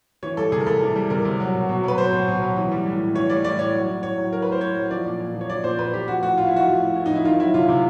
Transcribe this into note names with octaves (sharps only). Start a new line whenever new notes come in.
E3 C#5
G3 A4
C3 G#4
A#4
C3 A4
E3
G3
C3 A#4
C3
F#3
B2
B2
F#3 B4
F#3 C5
B2
B2
F#3
E3
G3
A2
A2
E3 C#5
G3 D5
A2 D5
A2 C#5
F#3
A2
A2 C#5
F#3
F#3 A#4
A2 B4
C5
A2 C#5
F#3
F3 D5
A#2
A#2
F3
C#5
F3 D5
A#2 C5
A#2 B4
F3 G4
F3 F#4
A2 F#4
A2 F4
E4
F3 F#4
F3
A2
A2
D#4
F3
E4
D#3 F4
F#3 E4
C3 F4
C3